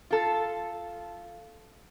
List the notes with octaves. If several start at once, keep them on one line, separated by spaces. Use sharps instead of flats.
F4 A4